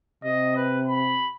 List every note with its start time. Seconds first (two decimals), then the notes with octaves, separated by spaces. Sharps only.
0.24 C3 D#5
0.56 B4
0.88 B5